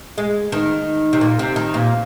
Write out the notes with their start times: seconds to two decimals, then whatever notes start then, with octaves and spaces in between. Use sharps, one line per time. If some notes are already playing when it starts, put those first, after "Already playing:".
0.18 G#3
0.52 D#3
1.13 C3
1.21 A#2
1.39 C3
1.56 D#3
1.74 A#2